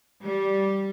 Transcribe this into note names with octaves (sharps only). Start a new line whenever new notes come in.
G3